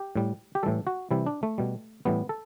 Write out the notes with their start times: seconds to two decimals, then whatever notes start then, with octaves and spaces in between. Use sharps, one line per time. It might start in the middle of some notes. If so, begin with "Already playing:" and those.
Already playing: G4
0.16 A2 G3
0.55 G4
0.63 A2 E3 G3 A4
0.87 F#4
1.11 C3 E3 G3 E4
1.26 D4
1.43 A3
1.58 B2 G3
2.05 A2 E3 G3 B3
2.29 A4